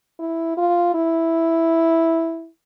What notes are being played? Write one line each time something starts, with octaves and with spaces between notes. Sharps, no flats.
E4
F4
E4